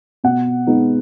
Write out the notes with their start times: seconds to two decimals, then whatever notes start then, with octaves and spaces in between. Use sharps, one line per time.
0.24 B2 F#5
0.67 G#3 B3 D#4